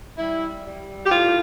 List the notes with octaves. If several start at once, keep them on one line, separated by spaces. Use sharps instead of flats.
G3 E4
G3
G4
A2 F4